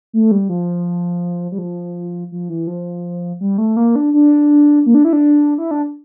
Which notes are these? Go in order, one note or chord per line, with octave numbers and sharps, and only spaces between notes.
A3
G3
F3
G3
F3
F3
E3
F3
G3
A3
A#3
D4
D4
A#3
D4
E4
D4
E4
D4